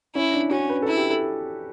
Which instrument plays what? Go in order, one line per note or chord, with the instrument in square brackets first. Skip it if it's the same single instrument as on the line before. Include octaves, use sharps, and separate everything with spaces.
[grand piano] C#4 [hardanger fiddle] E4
[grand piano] D4
[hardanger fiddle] C#4 [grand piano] F#4
[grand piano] B4
[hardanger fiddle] E4 [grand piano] A4
[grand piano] G4
A4